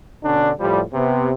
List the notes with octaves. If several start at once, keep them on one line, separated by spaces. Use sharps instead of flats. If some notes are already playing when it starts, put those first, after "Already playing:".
B2 D3 C#4 D4
A2 F3 G3
C3 B3